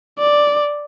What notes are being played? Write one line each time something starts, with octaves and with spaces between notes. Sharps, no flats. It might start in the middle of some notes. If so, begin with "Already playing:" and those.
D5